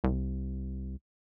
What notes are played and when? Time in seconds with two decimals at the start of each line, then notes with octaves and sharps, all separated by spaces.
0.04 C2